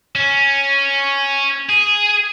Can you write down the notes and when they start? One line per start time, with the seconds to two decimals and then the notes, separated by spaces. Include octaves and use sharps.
0.15 C#4
1.69 G#4